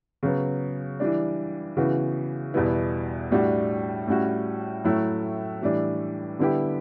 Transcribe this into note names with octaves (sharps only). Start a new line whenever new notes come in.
C#3 F#3 B3
E3 G3 D4
C#3 E3 B3 F#4
E2 B2 G3 B3 E4
A2 G3 D4 F#4
A2 G3 C#4 F#4
A2 F#3 A3 E4
A2 E3 G3 D4
D3 G3 B3 E4 G4